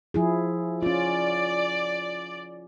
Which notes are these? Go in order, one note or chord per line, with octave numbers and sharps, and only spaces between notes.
F3 E4 G#4
C#4 F4 D5